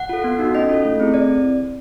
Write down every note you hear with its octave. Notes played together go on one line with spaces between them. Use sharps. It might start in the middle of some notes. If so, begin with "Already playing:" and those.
Already playing: F#5
F4 A4
B3
D#4 F#4 A4
C#4 D#5
F4 A4
A3
C4 E4 G#4
C4 D5